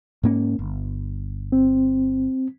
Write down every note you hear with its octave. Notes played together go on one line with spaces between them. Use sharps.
G#2 A#3 C#4
G1
C4